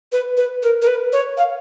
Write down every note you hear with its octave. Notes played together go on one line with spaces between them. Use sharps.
B4
B4
A#4
A#4
B4
C#5
F5